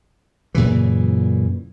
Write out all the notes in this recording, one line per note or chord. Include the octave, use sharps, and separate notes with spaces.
F#2 A#2 C#3 E3